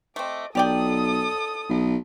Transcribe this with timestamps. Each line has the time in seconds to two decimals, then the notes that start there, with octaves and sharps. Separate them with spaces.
0.16 A3 C4 D#5 D6
0.55 B1 G4 A4 D5 G5 D#6
1.69 B1